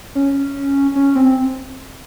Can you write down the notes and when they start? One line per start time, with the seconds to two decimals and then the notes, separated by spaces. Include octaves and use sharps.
0.15 C#4
0.95 C#4
1.15 C4